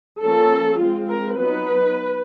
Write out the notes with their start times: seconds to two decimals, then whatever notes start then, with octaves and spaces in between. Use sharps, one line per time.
0.23 F3 A#3 C#4 A4
0.80 G#3 C4 F4
1.08 A#4
1.37 F#3 B3 D#4 B4